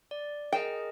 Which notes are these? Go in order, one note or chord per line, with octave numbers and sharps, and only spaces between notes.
D5
G#4 A#4 D#5 G5